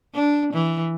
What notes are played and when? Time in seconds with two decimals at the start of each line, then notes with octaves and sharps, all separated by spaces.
0.15 D4
0.53 E3